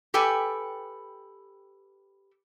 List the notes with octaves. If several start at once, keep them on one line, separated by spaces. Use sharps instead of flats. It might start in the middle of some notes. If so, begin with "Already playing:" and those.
G4 A4 B4 G5 G#5